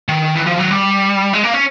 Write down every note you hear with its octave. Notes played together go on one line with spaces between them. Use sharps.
D#3
E3
F3
F#3
G3
G#3
A#3
C#4